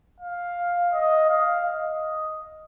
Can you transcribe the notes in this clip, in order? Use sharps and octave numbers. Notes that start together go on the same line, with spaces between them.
F5
D#5
F5
D#5